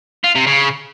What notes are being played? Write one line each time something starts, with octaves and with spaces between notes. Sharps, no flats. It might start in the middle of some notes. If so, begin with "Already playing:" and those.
F4
C3
C#3